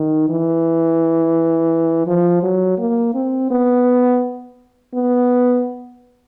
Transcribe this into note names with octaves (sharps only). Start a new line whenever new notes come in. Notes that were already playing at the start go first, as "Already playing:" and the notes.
Already playing: D#3
E3
F3
F#3
A#3
C4
B3
B3